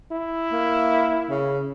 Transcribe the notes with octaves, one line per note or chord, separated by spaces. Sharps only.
E4
A#3
C#3